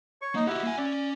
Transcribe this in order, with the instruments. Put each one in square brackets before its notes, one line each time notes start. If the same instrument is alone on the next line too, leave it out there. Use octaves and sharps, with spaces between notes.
[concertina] C#5 C#6
[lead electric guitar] A#3 [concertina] D#4
[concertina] E4 F#5 [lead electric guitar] F#4 G4
[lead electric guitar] A#3 G#5
[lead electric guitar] C#4 [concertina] D5